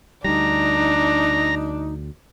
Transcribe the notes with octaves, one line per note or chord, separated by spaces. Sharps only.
D2 G3 D4 D#4 A#5